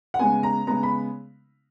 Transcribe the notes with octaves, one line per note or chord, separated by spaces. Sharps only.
F#5
C#3 G#3 B3 G#5
A#5
C#3 G#3 B3 A#5
B5